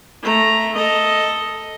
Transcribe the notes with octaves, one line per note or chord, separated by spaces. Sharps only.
A3 A#5
A4 D#5